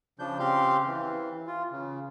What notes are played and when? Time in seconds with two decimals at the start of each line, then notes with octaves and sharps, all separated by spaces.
0.19 C#3 F3 D4 G6
0.40 C#3 C4 G4 F5 C6 G6
0.87 E3
1.47 F4
1.72 C#3